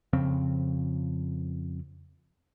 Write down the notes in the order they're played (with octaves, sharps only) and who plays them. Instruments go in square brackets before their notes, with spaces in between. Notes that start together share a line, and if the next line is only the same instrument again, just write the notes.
[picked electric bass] F2 C#3 F3 C4